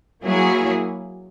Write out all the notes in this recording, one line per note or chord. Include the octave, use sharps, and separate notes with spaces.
F#3 A#3 E4 G#4 C#5